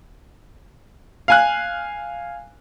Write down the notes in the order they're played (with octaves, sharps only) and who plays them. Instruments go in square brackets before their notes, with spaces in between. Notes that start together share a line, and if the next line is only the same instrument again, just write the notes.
[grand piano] F5 G#5 F#6